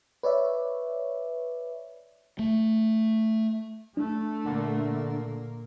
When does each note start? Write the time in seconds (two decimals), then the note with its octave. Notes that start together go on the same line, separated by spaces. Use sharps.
0.23 B4 C#5 D5 E5
2.39 A3
3.97 A3 D4
4.45 A#2 D3 A#3